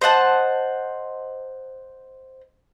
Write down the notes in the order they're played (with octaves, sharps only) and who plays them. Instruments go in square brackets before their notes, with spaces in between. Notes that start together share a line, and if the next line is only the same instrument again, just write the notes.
[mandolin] C5 D#5 F#5 A5